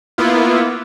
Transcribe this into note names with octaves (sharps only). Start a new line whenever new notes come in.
A#3 B3 E4 F4